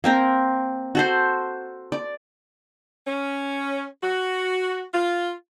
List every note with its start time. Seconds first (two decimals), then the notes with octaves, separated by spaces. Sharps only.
0.04 A#3 C4 A#4
0.95 F#4 A4 C5
1.92 D5
3.07 C#4
4.03 F#4
4.94 F4